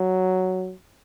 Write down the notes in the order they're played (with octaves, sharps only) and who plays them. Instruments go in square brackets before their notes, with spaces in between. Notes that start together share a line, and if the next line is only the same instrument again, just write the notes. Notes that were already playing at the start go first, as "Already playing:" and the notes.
Already playing: [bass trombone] F#3